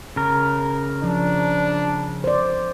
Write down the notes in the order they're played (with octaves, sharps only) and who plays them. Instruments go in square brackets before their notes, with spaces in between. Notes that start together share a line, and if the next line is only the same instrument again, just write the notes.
[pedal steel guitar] C#3 A#4
[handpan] F3 [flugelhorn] D4
[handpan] C5 D5